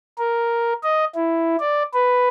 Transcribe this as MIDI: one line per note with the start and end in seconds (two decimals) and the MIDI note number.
0.18 0.73 70
0.83 1.05 75
1.15 1.56 64
1.59 1.83 74
1.94 2.28 71